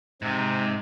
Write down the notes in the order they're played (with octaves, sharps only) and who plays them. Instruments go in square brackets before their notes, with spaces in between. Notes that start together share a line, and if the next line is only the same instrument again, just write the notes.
[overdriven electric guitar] G#2 [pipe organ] C3